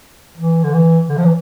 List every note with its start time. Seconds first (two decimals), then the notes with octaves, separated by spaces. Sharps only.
0.37 E3
0.63 D3
0.74 E3
1.09 D3
1.18 F3
1.25 E3